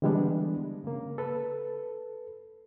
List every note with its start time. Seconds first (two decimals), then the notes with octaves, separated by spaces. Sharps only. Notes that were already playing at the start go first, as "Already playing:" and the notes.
0.02 D3 E3 G3 G#3 B3 D4
0.84 C#3 A#3
1.18 A4 B4